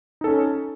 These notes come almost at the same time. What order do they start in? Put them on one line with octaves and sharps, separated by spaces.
D#4 A4 C#4